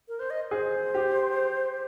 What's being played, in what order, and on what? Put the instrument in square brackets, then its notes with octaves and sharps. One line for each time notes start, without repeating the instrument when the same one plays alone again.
[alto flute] A#4
C5
D#5
[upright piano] G#4 [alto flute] C5
[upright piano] G4